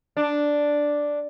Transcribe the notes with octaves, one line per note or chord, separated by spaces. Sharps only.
D4